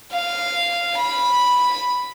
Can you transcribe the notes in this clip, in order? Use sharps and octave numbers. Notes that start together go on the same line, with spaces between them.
F5
B5